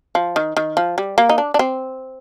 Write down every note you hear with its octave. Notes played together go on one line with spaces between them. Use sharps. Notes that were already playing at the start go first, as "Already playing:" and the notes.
F3
D#3
D#3
F3
G3
A#3
D#4
D4
D4
C4